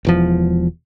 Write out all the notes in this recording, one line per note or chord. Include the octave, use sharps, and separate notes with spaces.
E1 E2 F3